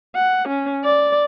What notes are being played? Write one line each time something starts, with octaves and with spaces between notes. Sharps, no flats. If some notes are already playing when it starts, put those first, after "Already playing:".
F#5
C#4
D5